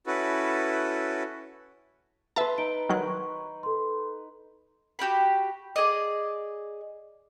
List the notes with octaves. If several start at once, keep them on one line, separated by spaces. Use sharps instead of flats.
C#4 E4 F#4 A4 B4
B4 E5 A5 C6
D#4 D7 G7
D#3 F#3 F#6
C#6
A4 C6
F#4 G4 G5 B5
G#4 D5 D#5